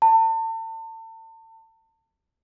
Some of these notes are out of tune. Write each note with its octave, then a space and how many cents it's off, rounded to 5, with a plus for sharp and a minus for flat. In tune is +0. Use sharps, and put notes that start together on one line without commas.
A5 +35